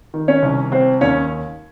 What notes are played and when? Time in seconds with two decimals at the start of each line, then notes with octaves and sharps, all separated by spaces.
0.14 D#3
0.28 C#4 C#5
0.43 C2
0.72 C4 C5
1.01 D#2 C#4 C#5